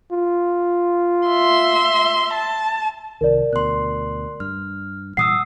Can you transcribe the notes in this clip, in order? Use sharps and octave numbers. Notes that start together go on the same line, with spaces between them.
F4
E5 C6
A5
C2 D#3 A#4 D5
D2 B2 C6 F#6
G2 F6
A#2 E3 G3 F#5 D#6 E6 C7